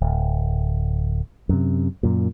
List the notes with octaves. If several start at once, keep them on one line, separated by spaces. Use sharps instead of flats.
D1
F#2 C3
F#2 A#2